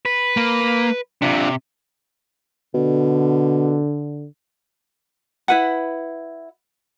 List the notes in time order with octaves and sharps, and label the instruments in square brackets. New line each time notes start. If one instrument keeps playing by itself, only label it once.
[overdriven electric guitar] B4
[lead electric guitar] A#3
[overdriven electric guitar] C3 [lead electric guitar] D4 F4
[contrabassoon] B2 [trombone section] D3
[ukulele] E4 B4 F#5